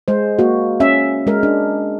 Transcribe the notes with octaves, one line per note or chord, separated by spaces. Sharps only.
G#3 C5
A#3 F#4
C#4 E5
G#3 A#4
D4